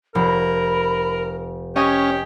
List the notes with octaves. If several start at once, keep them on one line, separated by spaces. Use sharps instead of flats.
F1 A#4 B5
C#4 G4 D#5 G#5 C#6 D#6